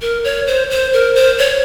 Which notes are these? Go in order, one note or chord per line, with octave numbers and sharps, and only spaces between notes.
A#4
C#5
C5
C5
A#4
C5
C#5